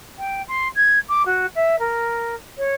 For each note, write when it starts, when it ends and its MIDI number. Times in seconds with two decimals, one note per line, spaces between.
0.18 0.42 79
0.48 0.68 84
0.76 0.99 92
1.08 1.23 86
1.26 1.46 66
1.55 1.79 76
1.79 2.35 70
2.57 2.74 73